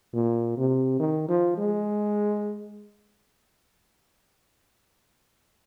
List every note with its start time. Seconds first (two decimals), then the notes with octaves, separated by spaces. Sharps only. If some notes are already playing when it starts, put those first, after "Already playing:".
0.14 A#2
0.57 C3
1.00 D#3
1.29 F3
1.58 G#3